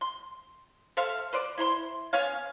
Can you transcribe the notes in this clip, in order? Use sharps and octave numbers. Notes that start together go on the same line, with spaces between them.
C6
A4 C5 E5 F5
B4 C5 D5
E4 C5 B5 C6
B3 C#4 C#5 F5